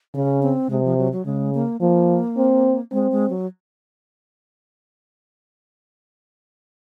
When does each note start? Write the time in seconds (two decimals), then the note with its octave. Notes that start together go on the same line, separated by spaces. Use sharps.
0.15 C#3 C#4
0.43 C4
0.70 C3 G#3
0.84 F3
0.98 F#3
1.12 F#3
1.25 C#3 G#3
1.54 A#3
1.81 F3 A#3
2.37 C4
2.92 G#3 C4
3.12 G#3
3.30 F#3